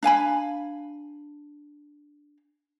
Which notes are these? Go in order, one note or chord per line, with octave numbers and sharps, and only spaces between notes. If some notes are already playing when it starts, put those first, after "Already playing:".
D4 F5 G#5 B5